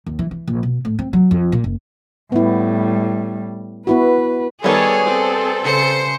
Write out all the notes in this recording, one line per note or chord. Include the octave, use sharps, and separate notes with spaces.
D#2
E3
E3
A#1
B2
A2
C4
F#3
F2
A#2
F#1
A2 G3 B3 E4
B3 E4 F#4 B4
D#3 G3 B3 G#4 A4 C#5
C4 A4
C#3 C5 C#7